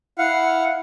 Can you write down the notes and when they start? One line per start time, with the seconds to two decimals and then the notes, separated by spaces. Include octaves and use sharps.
0.18 E4 F5 F#5